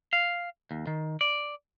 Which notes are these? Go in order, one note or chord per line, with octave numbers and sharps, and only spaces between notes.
F5
D#2
D#3
D5